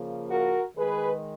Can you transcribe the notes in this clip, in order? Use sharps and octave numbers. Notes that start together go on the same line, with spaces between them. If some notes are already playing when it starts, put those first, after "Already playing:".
Already playing: C#3 F3 A#3
F#4 A#4
D#3 G#3 G#4 B4